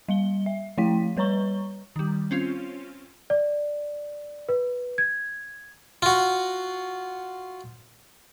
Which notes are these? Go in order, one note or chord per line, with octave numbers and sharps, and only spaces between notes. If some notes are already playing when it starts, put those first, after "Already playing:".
G3 F5 G7
E5
F3 A3 E4 G5 B6
G3 B4 C#5 A#5 C#6 G7
D#3 G3
C4 C#4 F4
D5
B4
G#6
F4 F#4